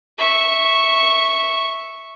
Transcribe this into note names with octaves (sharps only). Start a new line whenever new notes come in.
E5 C#6